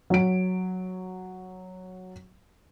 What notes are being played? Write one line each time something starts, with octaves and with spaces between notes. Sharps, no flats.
F#3 D7